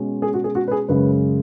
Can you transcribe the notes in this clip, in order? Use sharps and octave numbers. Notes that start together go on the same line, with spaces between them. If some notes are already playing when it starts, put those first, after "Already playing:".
Already playing: B2 G#3 C#4
G#4
F#4
G#4
F#4
B4
G#4
F#2 C#3 G#3 C#4 B4